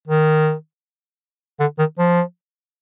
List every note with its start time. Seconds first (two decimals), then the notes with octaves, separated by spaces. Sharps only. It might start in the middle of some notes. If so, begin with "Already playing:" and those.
0.08 D#3
1.60 D3
1.79 D#3
1.99 F3